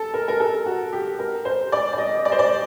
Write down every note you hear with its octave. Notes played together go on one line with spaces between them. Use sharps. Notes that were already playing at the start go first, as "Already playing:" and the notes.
Already playing: A4
A#4
A#4
A4
F#4
G4
A#4
C5
D5
D5
D#5
D5
C5
D5